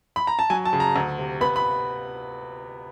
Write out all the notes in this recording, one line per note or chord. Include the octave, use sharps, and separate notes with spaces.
B5
A#5
A5
F#3 G#5
A5
C#3
A#5
D2
C3
B3 B5
B5